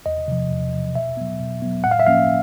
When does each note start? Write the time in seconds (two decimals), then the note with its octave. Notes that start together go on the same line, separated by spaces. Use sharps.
0.06 E2 D#5
0.28 C3 F3
0.51 E2
0.73 C3 F3
0.95 B2 E5
1.17 F#3 B3
1.40 B2
1.62 F#3 B3
1.84 A2 F#5
1.91 F5
2.00 E5
2.07 F3 A#3 C#4 F5